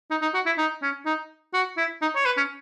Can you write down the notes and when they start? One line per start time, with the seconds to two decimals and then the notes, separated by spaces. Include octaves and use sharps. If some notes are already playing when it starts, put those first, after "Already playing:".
0.11 D#4
0.22 D#4
0.34 F#4
0.46 E4
0.58 D#4
0.82 C#4
1.06 D#4
1.54 F#4
1.77 E4
2.02 D#4
2.16 C#5
2.26 B4
2.37 C#4